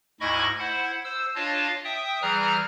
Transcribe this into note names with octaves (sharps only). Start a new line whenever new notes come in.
D2 G#2 E4 D#5 B5 C#6
E4 C5 F#5
C5 E6
D4 F4 C#5 D#5 F5 A5
E5 G5 D#6
E3 G3 G#4 A#5 F6 F#6